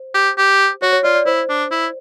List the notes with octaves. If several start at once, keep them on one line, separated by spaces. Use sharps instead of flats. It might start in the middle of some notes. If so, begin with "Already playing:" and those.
Already playing: C5
G4
G4
F#4 C#5
C#5
F4 D5
D5
E4 C5
D4
E4